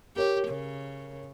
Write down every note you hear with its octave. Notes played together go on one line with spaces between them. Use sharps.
G4 A#4 C#5
C#3